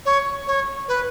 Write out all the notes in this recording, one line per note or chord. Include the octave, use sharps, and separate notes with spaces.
C#5
C#5
B4